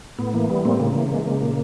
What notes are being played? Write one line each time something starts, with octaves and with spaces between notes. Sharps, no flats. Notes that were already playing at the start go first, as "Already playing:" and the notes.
A2 B3
E3 A#3
G3 B3
A2 A#3 C4
C#3 A#3
E3
G#3
C#3
A#2